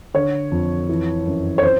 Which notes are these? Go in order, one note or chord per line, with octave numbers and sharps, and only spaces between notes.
D3 C#5
F2
E3
F#2
C#5
C4 C5